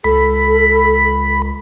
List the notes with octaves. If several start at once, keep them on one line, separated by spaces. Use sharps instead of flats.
C#2 A4 B5